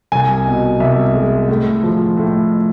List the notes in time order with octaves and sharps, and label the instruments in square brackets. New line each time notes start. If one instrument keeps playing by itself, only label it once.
[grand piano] C2 G#5
B2
C2 E5
G#3
A2
F3
A2